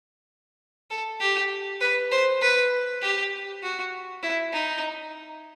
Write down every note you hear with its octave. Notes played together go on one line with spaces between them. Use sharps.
A4
G4
B4
C5
B4
G4
F#4
E4
D#4